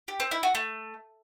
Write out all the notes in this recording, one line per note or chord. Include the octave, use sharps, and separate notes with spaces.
G4
C4
E4
F#4
A3